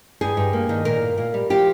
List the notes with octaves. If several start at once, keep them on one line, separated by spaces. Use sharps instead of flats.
G2 G#4
G2
A#3
D#3
A#2 A#4
A#2
A#2
G3
F3 G4